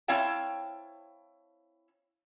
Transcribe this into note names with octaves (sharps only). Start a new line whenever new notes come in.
C4 E4 C#5 F5 G5 A5